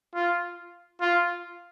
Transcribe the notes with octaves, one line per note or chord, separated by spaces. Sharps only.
F4
F4